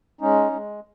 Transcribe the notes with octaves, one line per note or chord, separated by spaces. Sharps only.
G#3 C#4 D#4
G#3